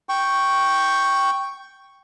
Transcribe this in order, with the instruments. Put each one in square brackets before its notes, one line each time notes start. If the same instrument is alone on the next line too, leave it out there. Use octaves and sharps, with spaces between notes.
[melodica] G5 C#6